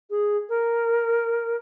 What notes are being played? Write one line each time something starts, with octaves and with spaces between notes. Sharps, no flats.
G#4
A#4